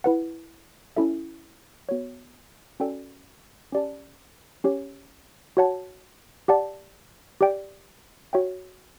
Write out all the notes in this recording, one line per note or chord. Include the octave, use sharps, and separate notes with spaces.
E4 B4 F#5
C#4 E4 A4 E5
B3 F#4 C#5
C#4 F#4 A4 D5 G5
C#4 G4 D5 A5
C#4 G4 C#5
F#4 C#5 F#5 A5
G4 D5 F#5 A5
G4 D5 G5
F#4 C#5 E5 G5